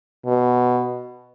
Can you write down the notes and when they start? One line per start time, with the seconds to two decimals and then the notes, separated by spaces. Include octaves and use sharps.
0.26 B2